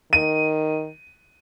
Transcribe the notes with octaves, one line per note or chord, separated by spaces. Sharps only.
D#3 D#7